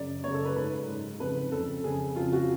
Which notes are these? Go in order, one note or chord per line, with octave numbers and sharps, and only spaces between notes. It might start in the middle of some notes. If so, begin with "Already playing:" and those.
Already playing: F#2 C#3 D5
F#2 C#3 C#5
A4
B4
G#2 B4
G#2
F2 C#3 B4
F2 C#3 A4
F2 C#3 G#4
F2 C#3 F4
F#4